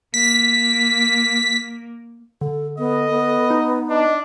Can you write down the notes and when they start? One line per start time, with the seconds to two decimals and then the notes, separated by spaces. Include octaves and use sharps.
0.14 A#3 B6
2.41 D3 A4
2.78 B3 A4 D#5
3.10 B3
3.50 D#4
3.89 D4 D#5